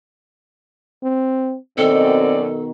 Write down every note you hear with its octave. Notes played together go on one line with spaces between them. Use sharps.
C4
F#2 B2 D#3 C4 A4 D5